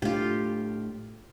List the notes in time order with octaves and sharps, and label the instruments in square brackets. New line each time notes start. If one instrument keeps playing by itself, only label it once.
[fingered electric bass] A2 A3 D4 [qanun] F4 G4